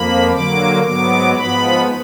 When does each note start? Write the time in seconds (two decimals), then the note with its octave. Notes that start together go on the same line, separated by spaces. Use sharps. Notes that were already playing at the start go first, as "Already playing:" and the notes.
Already playing: F2 F3 A#3 B5
0.31 D3 F#3 A#3 D6
0.83 G#2 F#3 B3 D6
1.35 G#2 F3 B3 B5